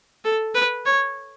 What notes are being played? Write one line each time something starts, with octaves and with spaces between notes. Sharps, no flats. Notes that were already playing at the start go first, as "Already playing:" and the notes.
A4
B4
C#5